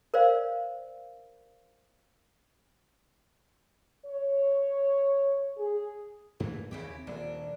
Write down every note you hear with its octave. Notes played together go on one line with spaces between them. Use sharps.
A#4 C5 D5 F5
C#5
G#4
G2 A#2 E3 A3
D#2 C#3 C4 E4 G4
D#1 A#1 D4